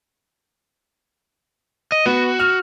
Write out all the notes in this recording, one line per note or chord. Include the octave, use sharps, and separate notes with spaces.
D#5
B3 F#4
F6